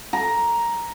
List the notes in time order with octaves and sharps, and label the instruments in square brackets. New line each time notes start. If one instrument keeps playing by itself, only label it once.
[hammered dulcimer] A#5